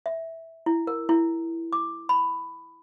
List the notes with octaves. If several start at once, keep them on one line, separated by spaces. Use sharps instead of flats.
E5
E4
A#4
E4
D6
B5